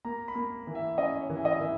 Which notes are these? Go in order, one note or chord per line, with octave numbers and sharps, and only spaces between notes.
A#3 A#5
B5
A#3
E3
E5
C#4 D#5
C#5
E3
E5
D#5
E3 E5